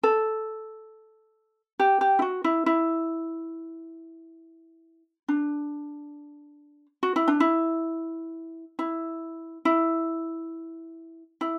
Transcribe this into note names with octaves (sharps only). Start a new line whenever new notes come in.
A4
G4
G4
E4
F#4
E4
E4
D4
F#4
E4
D4
E4
E4
E4
E4